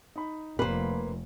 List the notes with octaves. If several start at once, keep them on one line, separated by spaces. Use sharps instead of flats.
D#4 B5
F1 A#3 B4 C5